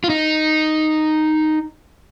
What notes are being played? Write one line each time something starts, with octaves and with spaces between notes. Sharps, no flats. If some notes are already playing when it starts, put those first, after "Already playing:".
F4
D#4